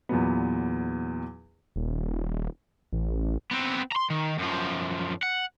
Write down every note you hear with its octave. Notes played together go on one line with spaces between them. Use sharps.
E2 A#2 F#3 B3
D#1
A1
B3 C4
A#5 C6
D#3
F#2 F3
F#5